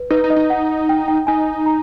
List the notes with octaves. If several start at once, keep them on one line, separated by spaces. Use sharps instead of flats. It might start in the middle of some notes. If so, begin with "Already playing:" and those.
Already playing: B4
D#4 B4
D#4
D#5
D#4
F#5
G5
G5
D#4 G#5
A#5